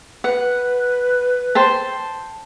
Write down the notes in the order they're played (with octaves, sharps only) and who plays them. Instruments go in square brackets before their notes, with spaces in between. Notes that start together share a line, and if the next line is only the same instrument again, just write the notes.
[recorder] B4 [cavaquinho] F#5
[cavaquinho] C5 G5 A5